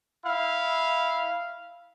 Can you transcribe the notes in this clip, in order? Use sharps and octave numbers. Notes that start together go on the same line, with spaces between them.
E4 F5